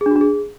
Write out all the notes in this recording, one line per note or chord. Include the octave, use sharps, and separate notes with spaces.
G#4
D4
F#4
D4
G#4